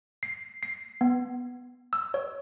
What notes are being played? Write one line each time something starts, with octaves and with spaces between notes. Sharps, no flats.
C7
C7
B3
E6
C#5